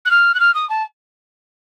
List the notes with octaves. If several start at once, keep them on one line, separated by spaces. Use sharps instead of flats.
F#6
F6
F#6
F6
D#6
A5